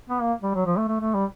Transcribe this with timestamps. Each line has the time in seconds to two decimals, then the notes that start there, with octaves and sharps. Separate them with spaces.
0.09 B3
0.21 A#3
0.43 G3
0.55 F#3
0.66 F3
0.77 A3
0.88 A3
1.00 A3
1.15 G3